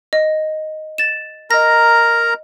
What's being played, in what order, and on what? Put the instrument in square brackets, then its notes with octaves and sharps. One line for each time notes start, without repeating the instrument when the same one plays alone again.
[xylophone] D#5
A6 E7
[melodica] A#4 A#5 [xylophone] D#5 A#6